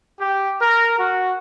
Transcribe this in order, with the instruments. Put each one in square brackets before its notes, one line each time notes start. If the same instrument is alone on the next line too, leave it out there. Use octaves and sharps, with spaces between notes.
[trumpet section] G4
A#4
F#4